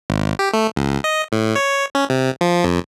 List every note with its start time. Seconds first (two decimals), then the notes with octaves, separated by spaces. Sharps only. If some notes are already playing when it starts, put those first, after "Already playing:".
0.10 G#1
0.39 G4
0.53 A3
0.76 C#2
1.04 D#5
1.32 A2
1.56 C#5
1.95 C#4
2.10 C3
2.41 F3
2.64 F2